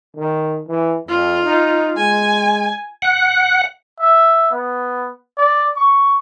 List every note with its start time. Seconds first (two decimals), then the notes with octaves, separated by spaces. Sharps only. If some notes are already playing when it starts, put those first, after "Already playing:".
0.16 D#3
0.68 E3
1.09 F2 F4
1.43 D#4
1.97 G#3 G#5
3.02 F#5
4.00 E5
4.51 B3
5.37 D5
5.76 C#6